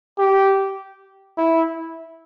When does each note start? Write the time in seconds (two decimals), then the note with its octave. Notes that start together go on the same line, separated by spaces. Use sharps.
0.19 G4
1.37 E4